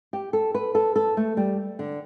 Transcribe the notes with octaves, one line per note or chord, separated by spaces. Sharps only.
G4
A4
B4
A4
A4
A3
G3
D3